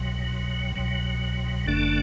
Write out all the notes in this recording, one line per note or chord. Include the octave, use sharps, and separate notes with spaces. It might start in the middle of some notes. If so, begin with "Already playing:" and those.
Already playing: C2 B2 F#3
C2 B2 F#3
G1 F#2 D3 A3 D4